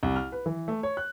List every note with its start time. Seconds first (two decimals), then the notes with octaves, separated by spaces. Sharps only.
0.03 C2
0.16 F6
0.32 B4
0.46 E3
0.68 A3
0.83 C#5
0.97 F#6